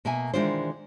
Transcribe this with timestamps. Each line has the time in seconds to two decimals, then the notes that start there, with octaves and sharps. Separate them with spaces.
0.05 B2 A#3 E5 G#5
0.34 D#3 E3 G#3 D4 F4 C5